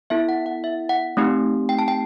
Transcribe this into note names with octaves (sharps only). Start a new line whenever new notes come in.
B3 E4 A4 E5
F#5
F#5
E5
F#5
A3 C4 D#4 G4
G5
A5
G5